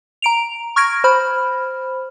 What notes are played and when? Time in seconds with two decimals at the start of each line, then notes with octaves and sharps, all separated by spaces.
0.22 A#5 D7 F7
0.76 C#6 F6 G#6 A#6 D7
1.04 C5 B5 F6